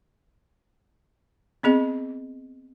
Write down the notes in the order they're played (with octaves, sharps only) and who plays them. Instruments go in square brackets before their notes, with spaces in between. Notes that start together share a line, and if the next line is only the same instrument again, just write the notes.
[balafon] B3 C4 G#4 D#5